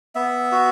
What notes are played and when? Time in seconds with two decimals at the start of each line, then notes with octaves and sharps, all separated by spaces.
0.15 B3 E5
0.52 F#4